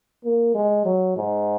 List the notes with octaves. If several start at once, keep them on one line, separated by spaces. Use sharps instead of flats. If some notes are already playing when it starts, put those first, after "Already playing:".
A#3
G#3
F#3
G#2